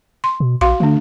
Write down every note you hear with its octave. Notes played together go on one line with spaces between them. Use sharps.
C6
B2
A#1 F#4 F5 C6
D3 A3 D4